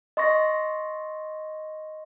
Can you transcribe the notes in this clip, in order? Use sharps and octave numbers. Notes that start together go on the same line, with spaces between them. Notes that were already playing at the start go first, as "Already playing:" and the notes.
D#5 C6 C#6 A#6